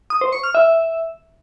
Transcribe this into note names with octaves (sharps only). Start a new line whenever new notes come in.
D#6
C5
C#6
F6
E5